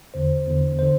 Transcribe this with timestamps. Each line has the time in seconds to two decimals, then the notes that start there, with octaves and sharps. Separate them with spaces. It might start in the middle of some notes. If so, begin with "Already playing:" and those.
0.14 E2 D3 C5
0.47 E2 D3
0.79 D3 C5